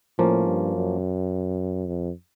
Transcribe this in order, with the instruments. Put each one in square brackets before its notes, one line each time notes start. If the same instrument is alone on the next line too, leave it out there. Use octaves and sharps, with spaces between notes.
[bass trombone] A2 [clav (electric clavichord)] F3 A#3 C#4
[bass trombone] G2
F#2
F2